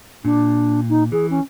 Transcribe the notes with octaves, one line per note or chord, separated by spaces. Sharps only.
A#2 D4
D#4
E3 G#4
C#4